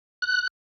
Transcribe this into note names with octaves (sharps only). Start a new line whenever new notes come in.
F#6